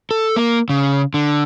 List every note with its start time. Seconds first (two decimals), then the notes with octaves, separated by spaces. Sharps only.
0.11 A4
0.36 A#3
0.69 C#3
1.14 D3